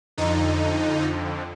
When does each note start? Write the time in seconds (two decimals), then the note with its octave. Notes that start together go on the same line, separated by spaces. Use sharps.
0.17 F2 D3 D#4